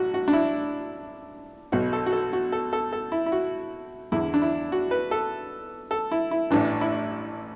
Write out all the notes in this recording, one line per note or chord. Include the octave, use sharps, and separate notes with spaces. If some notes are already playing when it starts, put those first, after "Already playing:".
Already playing: A1 F#4
F#4
D4
E4
B1 B2 F#4
A4
F#4
A4
F#4
A4
A4
A4
E4
E4
F#4
E2 D3 E4
D4
E4
F#4
B4
A4
A4
E4
E4
A1 A2 E3 D4
E4